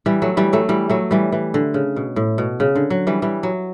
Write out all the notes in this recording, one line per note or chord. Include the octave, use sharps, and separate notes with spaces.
E3 G3
F#3 A3
E3 G3
F#3 A3
E3 G3
F#3 A3
E3 G3
E3
D3
C#3
B2
A2
B2
C#3
D3
F#3
E3 G3
E3 G3
F#3